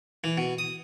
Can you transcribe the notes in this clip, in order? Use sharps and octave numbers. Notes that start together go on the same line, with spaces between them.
E3
B2
D#6